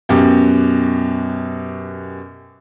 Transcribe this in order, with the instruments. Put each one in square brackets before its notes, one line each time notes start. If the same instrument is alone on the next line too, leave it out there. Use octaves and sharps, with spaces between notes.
[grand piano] F#2 B2 G4